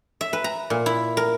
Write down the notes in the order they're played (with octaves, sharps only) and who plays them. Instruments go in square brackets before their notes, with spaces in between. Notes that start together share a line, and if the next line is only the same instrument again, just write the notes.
[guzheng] E5
B4
A#5
A#2
E4
A#4